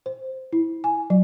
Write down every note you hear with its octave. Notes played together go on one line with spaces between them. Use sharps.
C5
E4
G#5
F#3